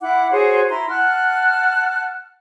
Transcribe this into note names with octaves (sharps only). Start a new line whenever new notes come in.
E4 F#5 D6
F#4 G#4 C5 C#5
E4 A#5 C6
F#5 A5 F6 F#6